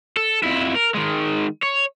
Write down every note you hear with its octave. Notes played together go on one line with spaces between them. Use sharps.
A4
F2 E4
A#4
D#3 G#3
C#5